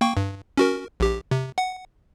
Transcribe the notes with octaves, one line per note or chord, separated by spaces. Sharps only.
A#3 G5 C#6
G2
C#4 F#4 A#4
A#1 G4
C3
F#5